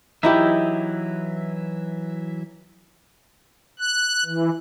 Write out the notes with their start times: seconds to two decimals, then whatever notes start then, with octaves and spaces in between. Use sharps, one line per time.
0.23 E3 F#3 D#4 E4 G4 E5
3.79 F#6
4.25 E3